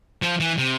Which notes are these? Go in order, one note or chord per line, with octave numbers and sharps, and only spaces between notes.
F3
E3
C3